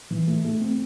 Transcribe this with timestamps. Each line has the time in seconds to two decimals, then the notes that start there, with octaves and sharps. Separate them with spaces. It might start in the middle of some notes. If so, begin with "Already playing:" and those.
0.10 E3
0.27 A3
0.45 A3
0.61 C4